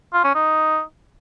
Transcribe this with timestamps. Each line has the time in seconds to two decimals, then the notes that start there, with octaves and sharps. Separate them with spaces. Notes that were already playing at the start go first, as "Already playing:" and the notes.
0.13 F4
0.24 C#4
0.35 D#4